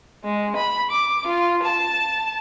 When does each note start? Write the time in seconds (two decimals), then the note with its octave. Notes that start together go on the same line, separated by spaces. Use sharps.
0.25 G#3
0.56 B5
0.91 D6
1.27 F4
1.64 A5